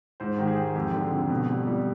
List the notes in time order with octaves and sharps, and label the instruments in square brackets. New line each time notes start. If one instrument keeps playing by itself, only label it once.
[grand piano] G#2 C5
D#3 G4
G#4
G#2
F2 G4
D3
F2
B2
G3
G3